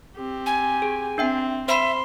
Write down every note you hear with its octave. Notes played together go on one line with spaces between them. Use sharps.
C4 G4
G#5
G#4
C4 D4 E5 G5
C5 E5 B5 C6